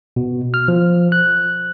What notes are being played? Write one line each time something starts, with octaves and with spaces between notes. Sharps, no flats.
B2
F6
F3
F#6